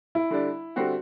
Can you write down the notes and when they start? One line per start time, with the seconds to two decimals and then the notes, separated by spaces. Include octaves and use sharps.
0.15 E4
0.30 D3 G3 D4
0.76 D3 G3 C4 F#4